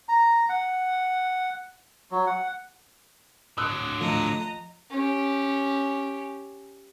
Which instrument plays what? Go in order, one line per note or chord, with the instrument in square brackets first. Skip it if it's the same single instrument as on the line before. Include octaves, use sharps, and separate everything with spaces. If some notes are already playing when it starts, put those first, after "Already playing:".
[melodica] A#5
F#5
F#3
F#5
[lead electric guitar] D3 F#3 [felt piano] D#6 E6 F#6
[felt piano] F3 [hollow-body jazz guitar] A3 [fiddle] D#5 A#5
[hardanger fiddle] C#4 G4